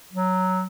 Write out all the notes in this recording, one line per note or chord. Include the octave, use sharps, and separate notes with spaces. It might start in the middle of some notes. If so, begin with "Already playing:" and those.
F#3